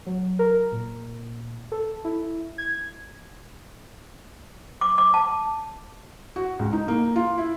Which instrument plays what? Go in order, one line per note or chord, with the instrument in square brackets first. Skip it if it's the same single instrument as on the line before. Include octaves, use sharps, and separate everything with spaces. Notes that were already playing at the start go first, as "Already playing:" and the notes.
[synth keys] F#3
A#4
A#2
A4
E4
G#6
[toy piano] D6
D6
A5
[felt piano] F#4
C#2
D#4
A#3
F4
E4